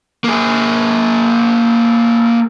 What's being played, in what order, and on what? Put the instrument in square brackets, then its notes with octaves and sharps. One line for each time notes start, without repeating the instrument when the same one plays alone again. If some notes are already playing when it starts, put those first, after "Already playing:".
[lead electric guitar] A#3 G#4